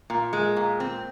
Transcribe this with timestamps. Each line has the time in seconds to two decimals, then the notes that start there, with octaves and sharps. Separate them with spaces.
0.10 A#2
0.33 G#3
0.56 A#2
0.80 C4